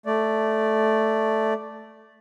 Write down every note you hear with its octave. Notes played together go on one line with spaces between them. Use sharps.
A3 D5